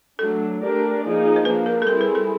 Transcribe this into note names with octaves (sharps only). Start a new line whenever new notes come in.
F#3 A3 D4 A4
A3 D4 G4 A#4 D5
F3 A#3 D#4 G#4
C5
F3 A#3 D4 B4
A#4
A4
G3 C4 E4 G#4 A#4
B4
A4